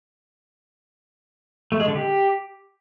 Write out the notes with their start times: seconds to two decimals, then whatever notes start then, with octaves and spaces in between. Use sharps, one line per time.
1.72 A3
1.80 G#3
1.88 D3
1.96 G4